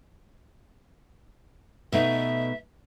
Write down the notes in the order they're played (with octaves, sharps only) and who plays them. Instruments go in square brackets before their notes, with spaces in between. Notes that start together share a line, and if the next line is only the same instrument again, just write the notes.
[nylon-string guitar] B2 A3 D#4 [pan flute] E5